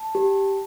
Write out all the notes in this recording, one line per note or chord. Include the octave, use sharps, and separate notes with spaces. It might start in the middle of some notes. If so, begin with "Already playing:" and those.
Already playing: A5
G4